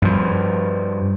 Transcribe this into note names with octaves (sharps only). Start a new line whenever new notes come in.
G2 F3